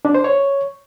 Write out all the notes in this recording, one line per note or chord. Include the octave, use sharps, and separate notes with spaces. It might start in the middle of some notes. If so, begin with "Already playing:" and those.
D4
C5
C#5